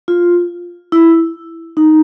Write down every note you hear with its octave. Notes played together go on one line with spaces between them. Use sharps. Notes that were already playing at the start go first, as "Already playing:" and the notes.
F4
E4
D#4